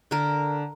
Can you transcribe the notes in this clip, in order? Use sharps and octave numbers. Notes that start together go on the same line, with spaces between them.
D3 A#4